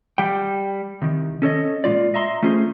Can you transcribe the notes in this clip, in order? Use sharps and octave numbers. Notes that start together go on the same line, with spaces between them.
G3 G5
C2 D#3
C#4 A4 C#5 D#5
A#2 G#3 F4 D5
D#5 E5 A#5 C6
A3 C#4 F4 G#4 C5